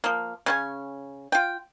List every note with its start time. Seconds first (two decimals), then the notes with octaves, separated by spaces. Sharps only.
0.04 F3 A#3
0.46 C#3 C#4 G#5
1.32 F4 G5